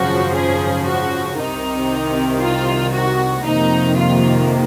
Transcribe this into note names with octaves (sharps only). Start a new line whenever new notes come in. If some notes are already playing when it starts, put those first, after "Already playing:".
Already playing: G#1 F#2 C#3 F3 F#4
G#4
F#4
C2 C3 D#3 D#4
F4
F#4
F2 C3 D#3 A#3 D#4
F4